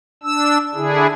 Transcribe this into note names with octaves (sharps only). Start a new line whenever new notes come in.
D4 E6
D3 D4 E4 G#4